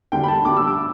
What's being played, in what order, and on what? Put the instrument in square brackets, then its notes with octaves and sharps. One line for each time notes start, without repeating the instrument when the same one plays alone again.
[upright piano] D2 D3 G3 G5
B5
A5
D2 D3 G3 D6
E6
D6